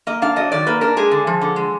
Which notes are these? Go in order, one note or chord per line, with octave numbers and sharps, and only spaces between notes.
A#3 D#5
D4 F5
F#3 D#5
D#3 D5
A#3 B4
D4 A#4
G#3 G#4
D3
F3
D3
G#3